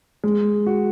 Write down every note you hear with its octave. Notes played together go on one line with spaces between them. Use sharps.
G#3
F#4